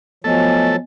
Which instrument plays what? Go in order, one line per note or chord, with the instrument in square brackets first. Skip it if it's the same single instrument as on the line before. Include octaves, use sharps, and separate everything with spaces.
[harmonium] F3 F#3 [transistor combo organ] A3 A4 [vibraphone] B3 D#5 G#5